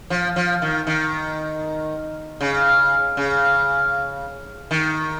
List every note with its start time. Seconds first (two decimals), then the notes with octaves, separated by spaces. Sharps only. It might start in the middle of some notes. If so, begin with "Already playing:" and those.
0.10 F3
0.36 F3
0.62 D#3
0.87 D#3
2.41 C#3
3.17 C#3
4.71 D#3